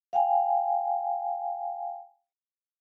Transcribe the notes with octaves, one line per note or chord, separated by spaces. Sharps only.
F5 G5 G#5